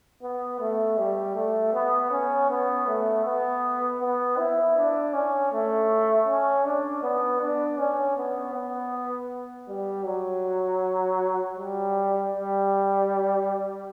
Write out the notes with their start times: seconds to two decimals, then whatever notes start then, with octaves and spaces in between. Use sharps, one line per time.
0.23 B3
0.60 A3
0.98 G3
1.35 A3
1.74 B3
2.11 C#4
2.50 B3
2.87 A3
3.25 B3
4.01 B3
4.38 E4
4.77 D4
5.13 C#4
5.52 A3
6.27 C#4
6.65 D4
7.03 B3
7.41 D4
7.79 C#4
8.17 B3
8.54 B3
9.68 G3
10.05 F#3
11.57 G3
12.33 G3